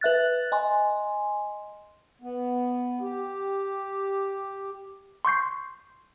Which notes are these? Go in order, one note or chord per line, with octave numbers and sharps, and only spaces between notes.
B4 E5 F#6 A6
D#5 G#5 C6
B3
G4
C6 C#6 G6 C7